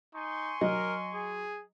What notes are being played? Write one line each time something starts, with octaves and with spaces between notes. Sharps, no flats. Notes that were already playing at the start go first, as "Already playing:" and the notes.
D#4 G#5 C6 C#6
F#3 A#4 D#5
G#4